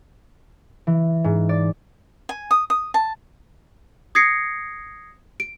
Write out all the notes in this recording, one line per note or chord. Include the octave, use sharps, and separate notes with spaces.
E3
G#2
D5
G#5
D#6
D#6
A5
D#6 G#6 A#6 C7 C#7
D7